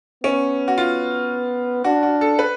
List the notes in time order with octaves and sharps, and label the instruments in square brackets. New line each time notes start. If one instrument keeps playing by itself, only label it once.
[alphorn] B3 [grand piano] C#4
[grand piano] F#4
F4
[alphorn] D4 [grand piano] F#4
[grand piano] F#4
A4
B4